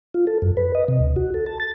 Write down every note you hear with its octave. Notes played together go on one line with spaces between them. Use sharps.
F4
A4
F#2
B4
D#5
C3
D2
F#4
A4
A5
A6